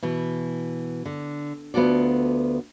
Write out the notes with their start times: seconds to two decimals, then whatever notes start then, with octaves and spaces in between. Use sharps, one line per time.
0.03 B2 E3
1.06 D3
1.74 D2 B3 F4 F#4 A4 D5